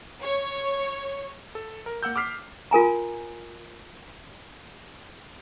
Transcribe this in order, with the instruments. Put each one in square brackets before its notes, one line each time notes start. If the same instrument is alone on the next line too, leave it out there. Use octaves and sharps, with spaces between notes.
[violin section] C#5
[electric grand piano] A4
A#4
A#3 F#5 E6 G6
D6 E6 F6 B6 C7
[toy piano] F4 A#4 G#5 A#5